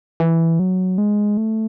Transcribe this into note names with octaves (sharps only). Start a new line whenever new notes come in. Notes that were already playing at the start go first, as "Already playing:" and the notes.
E3
F#3
G#3
A3